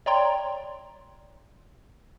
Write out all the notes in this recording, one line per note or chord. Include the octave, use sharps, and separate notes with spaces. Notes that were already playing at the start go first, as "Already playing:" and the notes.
C#5 D5 G5 A#5 C6